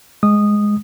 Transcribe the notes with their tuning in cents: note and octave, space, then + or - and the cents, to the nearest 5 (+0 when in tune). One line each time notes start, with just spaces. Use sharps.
G#3 +0 D#6 -10